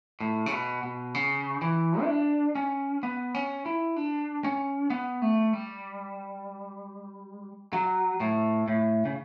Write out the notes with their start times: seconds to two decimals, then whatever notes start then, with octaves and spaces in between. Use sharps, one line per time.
0.20 A2
0.46 C#3
0.52 B2
0.83 B2
1.14 C#3
1.62 E3
2.02 E4
2.09 D4
2.55 C#4
3.03 B3
3.35 C#4
3.66 E4
3.96 D4
4.44 C#4
4.90 B3
5.22 A3
5.53 G3
7.73 F#3
8.20 A2
8.68 A2
9.05 C#3